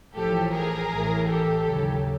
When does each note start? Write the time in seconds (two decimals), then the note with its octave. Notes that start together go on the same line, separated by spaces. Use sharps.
0.15 A1 A2 F3 G4 A4
0.52 G#4 A#4
0.90 A1 A2 E3
1.28 G4 A4
1.65 D#2 C#3 F#3